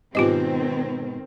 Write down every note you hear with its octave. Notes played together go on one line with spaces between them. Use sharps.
G#2 B2 D#3 C4 F4 G4 D#5